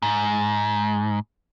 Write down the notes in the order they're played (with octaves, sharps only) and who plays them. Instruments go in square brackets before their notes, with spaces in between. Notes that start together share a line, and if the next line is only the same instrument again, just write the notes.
[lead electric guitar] G#2